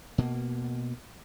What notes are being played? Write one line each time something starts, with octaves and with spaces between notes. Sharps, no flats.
B2 A#3